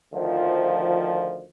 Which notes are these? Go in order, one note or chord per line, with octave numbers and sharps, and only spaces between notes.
D2 D#3 F3